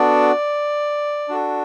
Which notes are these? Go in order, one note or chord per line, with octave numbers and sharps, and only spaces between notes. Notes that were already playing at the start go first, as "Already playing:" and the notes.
Already playing: B3 D4 F#4 A4 D5
D4 F#4 A4